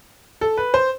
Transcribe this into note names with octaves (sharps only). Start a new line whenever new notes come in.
A4
B4
C5